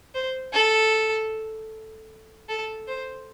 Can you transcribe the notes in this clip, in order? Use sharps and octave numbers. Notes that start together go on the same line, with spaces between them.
C5
A4
A4
C5